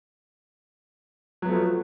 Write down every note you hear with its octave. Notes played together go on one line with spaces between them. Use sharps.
F3 F#3 A3 B3